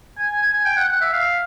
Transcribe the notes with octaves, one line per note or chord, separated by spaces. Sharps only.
G#5
G#5
G#5
G5
F#5
F#5
E5
F5